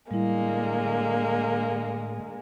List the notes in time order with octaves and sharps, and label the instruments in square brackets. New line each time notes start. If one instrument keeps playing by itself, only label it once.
[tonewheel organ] A2 [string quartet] D3 G#3 A#3 [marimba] G3 E4